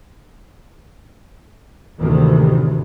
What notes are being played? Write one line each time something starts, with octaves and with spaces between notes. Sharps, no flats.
G#1 D2 A2 C3 D#3 E3